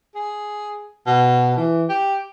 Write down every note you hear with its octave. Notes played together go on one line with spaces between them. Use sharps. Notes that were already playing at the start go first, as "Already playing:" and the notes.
G#4
B2
E3
G4